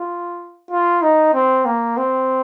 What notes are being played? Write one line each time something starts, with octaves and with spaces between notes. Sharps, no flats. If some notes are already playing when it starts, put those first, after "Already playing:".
Already playing: F4
F4
D#4
C4
A#3
C4